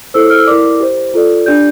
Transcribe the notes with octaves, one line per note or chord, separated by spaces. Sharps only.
E4 A4 C5 E6
F6
E6
E4 A#4 D5 D6
G4 C5
F4 A4 D5
D4 G4 D5 G6